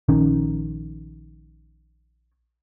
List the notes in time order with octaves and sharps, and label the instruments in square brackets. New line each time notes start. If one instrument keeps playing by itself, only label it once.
[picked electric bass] A#1 D#3 C#4